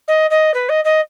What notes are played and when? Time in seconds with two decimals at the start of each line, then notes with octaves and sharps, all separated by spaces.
0.08 D#5
0.30 D#5
0.54 B4
0.69 D#5
0.84 D#5